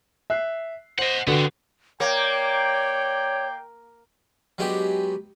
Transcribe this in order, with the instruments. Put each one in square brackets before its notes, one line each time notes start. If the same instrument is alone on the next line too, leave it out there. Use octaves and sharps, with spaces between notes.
[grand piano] E5 F#6 C7
[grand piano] C5 [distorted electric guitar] D#5 F#5
[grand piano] D3 F#4 B4 [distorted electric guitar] B3 C4
[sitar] A#3 [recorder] C#5 [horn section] D5 G5
[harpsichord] F#3 G#3 B3 D4 G4